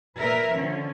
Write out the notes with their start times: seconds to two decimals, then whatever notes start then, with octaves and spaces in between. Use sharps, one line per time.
0.19 A#2 A#4 B4 E5
0.57 D3 F3 C#4